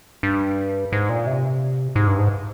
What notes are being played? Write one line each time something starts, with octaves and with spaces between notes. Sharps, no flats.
G2
G#2
A#2
C3
G#2
G2
G#2